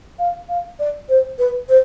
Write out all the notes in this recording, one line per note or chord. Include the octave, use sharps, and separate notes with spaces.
F5
F5
D5
C5
B4
C5